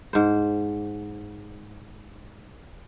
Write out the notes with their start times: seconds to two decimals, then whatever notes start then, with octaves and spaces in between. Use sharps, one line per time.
0.13 G#2 C5